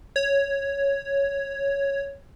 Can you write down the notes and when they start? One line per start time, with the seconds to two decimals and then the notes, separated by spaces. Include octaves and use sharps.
0.16 C#5